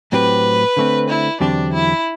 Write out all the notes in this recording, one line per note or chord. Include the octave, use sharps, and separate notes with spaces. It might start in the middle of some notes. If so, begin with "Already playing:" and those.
A2 F#3 C4 G4 B4
D3 A3 C4
E4
E2 D3 F#3 C4 D4 G4
E4